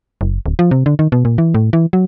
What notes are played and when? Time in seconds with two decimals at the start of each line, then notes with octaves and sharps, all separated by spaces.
0.21 F#1
0.46 D1
0.59 F3
0.71 C3
0.86 D3
0.99 D#3
1.12 B2
1.25 A#2
1.38 E3
1.54 A2
1.73 E3
1.93 F#3